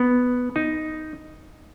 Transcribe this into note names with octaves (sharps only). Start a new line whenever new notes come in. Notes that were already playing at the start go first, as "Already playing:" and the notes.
Already playing: B3
D#4